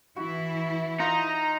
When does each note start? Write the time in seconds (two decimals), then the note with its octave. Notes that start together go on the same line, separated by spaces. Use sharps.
0.16 E3 E4 F#4
1.00 D#4 F4 D#5 A#5